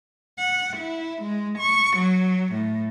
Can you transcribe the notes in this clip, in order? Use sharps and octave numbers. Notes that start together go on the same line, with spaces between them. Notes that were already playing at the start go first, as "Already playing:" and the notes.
F#5
E4
G#3
C#6
F#3
A2